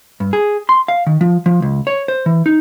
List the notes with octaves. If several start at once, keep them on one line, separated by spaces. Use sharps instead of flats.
G2
G#4
C6
F5
D#3
F3
F3
C#2
C#5
C5
E3
D#4